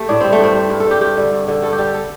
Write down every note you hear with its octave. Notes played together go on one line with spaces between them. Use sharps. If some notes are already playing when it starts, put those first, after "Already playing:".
Already playing: A3 G4
A2 D4
G3 C4
A3
G2 C4
G3
G2
A4
G3 G4
G2 G4
D3 G3
G2
D3 G3
G2 A4
G4
G3
A4